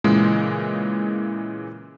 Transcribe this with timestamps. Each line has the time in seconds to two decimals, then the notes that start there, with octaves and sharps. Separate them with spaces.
0.04 A#2 C#3 E3 G#3